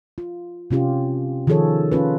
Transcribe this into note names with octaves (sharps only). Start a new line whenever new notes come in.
F4
C3 C#4 F4 G4
D#3 F3 F4 G#4 A4 C#5
C#4 F4 B4